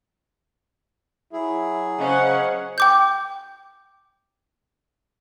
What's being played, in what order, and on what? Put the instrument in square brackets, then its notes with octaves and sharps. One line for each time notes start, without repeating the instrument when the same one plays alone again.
[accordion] F#3 G#4 [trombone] E4
[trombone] C#3 [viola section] C#4 F#5 [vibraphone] C5 D#5
[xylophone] G5 D6 G6